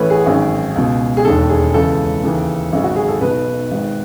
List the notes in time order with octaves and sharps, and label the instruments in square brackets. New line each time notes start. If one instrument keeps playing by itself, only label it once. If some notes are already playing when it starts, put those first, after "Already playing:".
Already playing: [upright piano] A1 A2 E3 B4 C#5
G#4
G#1 F#2 D#3
C#2 B2
G#4
E1 D#2 D#3 A4
G#4
C#2 C#3 E3 A4
D#2 C#3 E3
G#1 F#2 C#3
F#4
G#4
A4
B1 B2 B4
G#1 G#2 D#3